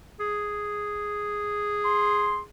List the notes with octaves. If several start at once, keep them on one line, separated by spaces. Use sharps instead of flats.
G#4
C6